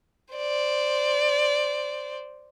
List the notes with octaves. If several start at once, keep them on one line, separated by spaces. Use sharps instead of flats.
C5 D5